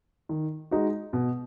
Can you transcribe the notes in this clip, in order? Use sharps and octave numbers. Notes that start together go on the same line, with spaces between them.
D#3
G#3 D#4 F#4
B2